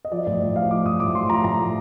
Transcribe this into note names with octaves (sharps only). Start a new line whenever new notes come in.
D#5
F3 D5
A2 D5
A2 D#5
F3 F5
F3 D6
A2 D#6
A2 D6
F3 C6
F3 A#5
A2 A#5
A2